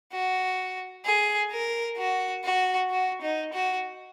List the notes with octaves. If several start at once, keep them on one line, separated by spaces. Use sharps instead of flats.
F#4
G#4
A#4
F#4
F#4
F#4
D#4
F#4